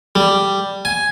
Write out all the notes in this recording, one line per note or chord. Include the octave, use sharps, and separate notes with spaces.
G3
G#5